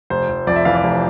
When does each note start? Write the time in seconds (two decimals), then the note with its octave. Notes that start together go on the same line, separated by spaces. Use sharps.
0.10 F1 C5
0.29 F1
0.47 F2 D5
0.56 E5
0.65 E3 F5
0.75 D5
0.84 F1